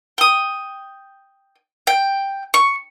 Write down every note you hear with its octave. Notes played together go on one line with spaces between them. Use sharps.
G5 D#6
G5
C#6